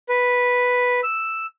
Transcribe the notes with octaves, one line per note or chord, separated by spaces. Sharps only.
B4
E6